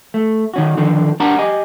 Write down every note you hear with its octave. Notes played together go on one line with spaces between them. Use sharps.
A3
D#3 C#4 F#4
D3 D#3 F3 A4
G3 D4 A#4 F#5 A5 A#5
G4 D#5 G#5